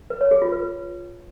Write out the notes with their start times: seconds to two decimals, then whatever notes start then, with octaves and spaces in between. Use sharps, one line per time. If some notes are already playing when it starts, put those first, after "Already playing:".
0.10 B4
0.21 C#5
0.31 G#4
0.42 F4
0.52 B4